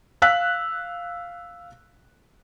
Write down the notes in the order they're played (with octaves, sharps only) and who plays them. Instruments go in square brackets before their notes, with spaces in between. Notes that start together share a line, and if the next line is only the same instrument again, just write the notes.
[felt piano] F5 E6 F#6 B6